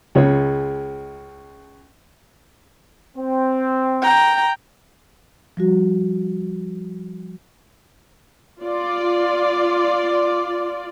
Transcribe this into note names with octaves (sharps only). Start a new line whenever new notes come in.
C#2 C#3 G#3 C#5
C4
G5 A#5
F3 G3 F#4
F4 D5